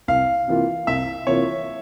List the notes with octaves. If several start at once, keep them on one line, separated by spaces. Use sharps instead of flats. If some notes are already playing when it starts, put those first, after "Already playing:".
C2 F5
C3 E3 A#3 F4
C2 E5
C3 E3 A#3 F4 C#5